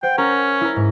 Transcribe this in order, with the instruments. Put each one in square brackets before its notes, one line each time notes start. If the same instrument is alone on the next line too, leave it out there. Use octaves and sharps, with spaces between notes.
[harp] C5 F#5 [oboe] G5
[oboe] C#4 [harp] A#4
[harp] E4 A#4
G#2